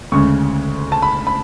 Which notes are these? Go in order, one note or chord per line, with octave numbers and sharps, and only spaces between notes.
D2 C#3 G#3 C#6
A5
B5
B5